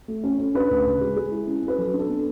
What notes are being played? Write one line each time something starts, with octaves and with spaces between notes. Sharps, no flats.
A3
C#4
C#4
D4 B4
D2
C#3
G#3
G#3 G#4
E4
C#4
C#4
B4
F#3 A4
D4
A4
B3